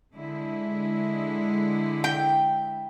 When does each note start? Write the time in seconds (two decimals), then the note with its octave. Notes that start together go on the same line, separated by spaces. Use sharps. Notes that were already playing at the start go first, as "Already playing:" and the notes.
0.14 D3 G#3 E4
2.04 G5